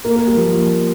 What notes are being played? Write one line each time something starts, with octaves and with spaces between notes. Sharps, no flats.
A#3
A#3
G3
F3